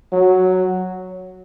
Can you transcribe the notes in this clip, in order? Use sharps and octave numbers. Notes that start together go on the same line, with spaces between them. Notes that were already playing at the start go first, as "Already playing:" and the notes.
F#3